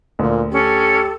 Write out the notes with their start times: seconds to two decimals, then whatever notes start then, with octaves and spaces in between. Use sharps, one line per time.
0.19 D2 A#2
0.52 C#4 G4 A4